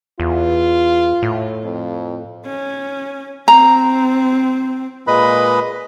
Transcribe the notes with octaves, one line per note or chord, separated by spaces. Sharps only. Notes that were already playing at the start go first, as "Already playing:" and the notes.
E2 F4
A2
F2
C#4
C4 A#5
A#2 G#3 B4 D#5 B5